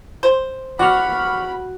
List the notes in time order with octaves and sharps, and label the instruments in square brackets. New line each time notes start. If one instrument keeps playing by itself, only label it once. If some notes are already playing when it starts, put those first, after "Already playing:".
[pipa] C5
[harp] F#4 [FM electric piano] D5 C#6 F6 [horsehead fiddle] B5